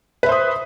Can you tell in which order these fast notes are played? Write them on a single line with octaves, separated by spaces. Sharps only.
B4 E5 C5 D#6